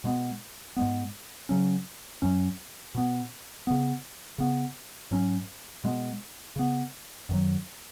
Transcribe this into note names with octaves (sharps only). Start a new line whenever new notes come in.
B2 G#3 B3
G#2 G#3 B3
C#3 F#3 C#4
F#2 F#3 C#4
B2 B3
C#3 B3
C#3 B3
G#2 F#3 C#4
B2 G#3 B3
C#3 B3
F#2 D#3 F#3